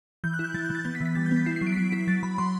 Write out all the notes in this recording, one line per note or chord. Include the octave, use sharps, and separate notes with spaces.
E3 G6
F#6
E4
G6
E3 A6
G6
E3 A6
B3 G6
B6
E3
B6
G3 A6
G6
B3
B6
E4 C7
C7
F#3
D7
B6
F#3 C7
E4 B6
F#3 A6
F#3 B5
F#3 C6